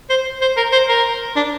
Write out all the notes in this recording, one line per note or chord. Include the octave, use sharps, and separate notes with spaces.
C5
C5
A#4
C5
A#4
D4